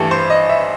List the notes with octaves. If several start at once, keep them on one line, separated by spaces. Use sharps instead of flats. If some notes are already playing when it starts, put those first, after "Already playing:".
Already playing: G2 E3 A3 G4 A4
C5
D#5
E5